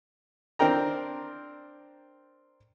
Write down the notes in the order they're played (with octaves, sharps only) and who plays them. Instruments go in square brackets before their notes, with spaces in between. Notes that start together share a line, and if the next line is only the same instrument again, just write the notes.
[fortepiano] C4 D4 A#4 G5 A#5